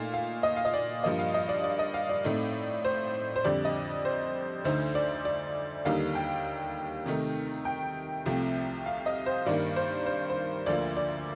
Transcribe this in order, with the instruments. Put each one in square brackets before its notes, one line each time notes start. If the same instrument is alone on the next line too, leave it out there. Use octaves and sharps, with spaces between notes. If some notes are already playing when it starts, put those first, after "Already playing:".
Already playing: [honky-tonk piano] A#2 A3 D#4 F5
F5
D#5
F5
D#5
D5
G2 F3 A#3 D#5
F5
D#5
D5
D5
D#5
F5
D5
A2 A3 C4 D#4
C5
C5
F2 D3 G3 D5
D#5
C5
D2 D3 A3 D#4 C5
D5
D5
D#2 D3 G3 A#3 D#4 F5
G5
C3 D#3 A3 D#4
G5
C2 C3 F3 A3 C4
F5
D#5
C5
G2 D#3 A#3 D5
C5
C5
C5
D2 D3 F3 A#3 D5
D5